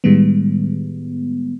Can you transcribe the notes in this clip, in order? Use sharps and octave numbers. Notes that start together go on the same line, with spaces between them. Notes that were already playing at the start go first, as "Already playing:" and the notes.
A2 D#3 G3 G#3 B3